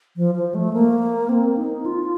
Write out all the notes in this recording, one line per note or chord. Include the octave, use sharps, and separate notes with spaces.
F3
F3
A3
A#3
C4
D#4
F4